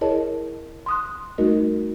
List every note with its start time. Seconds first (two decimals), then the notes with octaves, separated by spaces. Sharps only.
0.01 E4 G#4 A#4 C#5 D#5 A5
0.86 C6 D#6 F#6
1.38 G3 A3 D#4 F#4 A#4 D#5